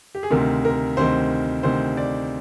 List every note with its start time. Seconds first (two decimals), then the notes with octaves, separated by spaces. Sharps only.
0.15 G4
0.23 G#4
0.31 D2 C3 D#3 A#4
0.65 A#4
0.97 D2 C3 D#3 C5
1.63 D2 C3 D#3 C5
1.97 D5